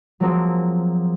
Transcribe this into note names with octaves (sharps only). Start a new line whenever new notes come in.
F3 F#3 G#3 A#3 C4